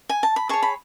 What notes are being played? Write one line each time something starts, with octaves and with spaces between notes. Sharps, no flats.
G#5
A5
B5
G#4 C#5 A5 C#6
B5